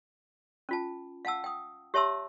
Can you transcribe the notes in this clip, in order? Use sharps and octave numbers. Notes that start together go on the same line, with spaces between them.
C#4 F4 A5
F5 F#5 A5 E6
G5 D#6
G4 C#5 E5 A5 C6 E6